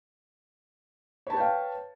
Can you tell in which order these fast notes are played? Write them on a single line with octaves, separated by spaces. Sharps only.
C#5 A5 B4 G5 F5